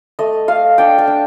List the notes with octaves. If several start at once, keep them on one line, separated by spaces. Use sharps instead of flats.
A3 D#5
A3 F5
D4 G5
A5
D4